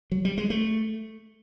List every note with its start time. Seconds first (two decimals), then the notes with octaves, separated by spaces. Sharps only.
0.12 F#3
0.25 G3
0.38 G#3
0.50 A3